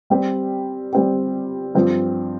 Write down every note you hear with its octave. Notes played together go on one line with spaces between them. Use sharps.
G3 C4 G4
G3 C4 G4
G2 F3 C4